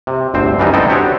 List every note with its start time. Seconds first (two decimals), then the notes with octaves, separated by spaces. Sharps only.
0.07 C3
0.34 G1 D2 C4 C5
0.59 F#2 E3 G3 D4 D#4
0.74 B3 C4 D#4 E4 A4 G5
0.89 D4 F#4 G4 C5 C#5